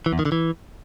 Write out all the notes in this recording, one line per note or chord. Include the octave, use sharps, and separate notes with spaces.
E3
E2
D#3
D3
E3